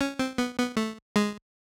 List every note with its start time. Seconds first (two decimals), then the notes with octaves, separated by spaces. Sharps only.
0.01 C#4
0.19 C4
0.38 B3
0.58 B3
0.77 A3
1.16 G#3